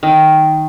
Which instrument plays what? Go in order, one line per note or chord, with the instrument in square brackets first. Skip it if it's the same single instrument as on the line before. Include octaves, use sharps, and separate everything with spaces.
[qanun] D#3